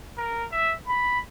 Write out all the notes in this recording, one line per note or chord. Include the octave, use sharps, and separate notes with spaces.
A#4
E5
B5